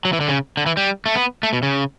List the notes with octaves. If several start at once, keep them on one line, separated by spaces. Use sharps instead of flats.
F#3
E3
D3
C#3
D3
E3
G3
A3
B3
A3
B2
C#3